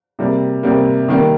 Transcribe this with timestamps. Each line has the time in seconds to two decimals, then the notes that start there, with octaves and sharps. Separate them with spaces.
0.19 C3 G3 A#3
0.63 C3 G3 A#3
1.08 D#3 G3 A#3